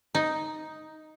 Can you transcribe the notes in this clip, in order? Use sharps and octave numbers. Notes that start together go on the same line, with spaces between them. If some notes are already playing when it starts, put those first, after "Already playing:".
D#4